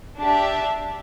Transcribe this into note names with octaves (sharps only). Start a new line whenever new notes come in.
D4 G4 E5 A5